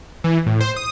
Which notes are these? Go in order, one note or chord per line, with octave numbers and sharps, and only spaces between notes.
E3
A2
C5
D#6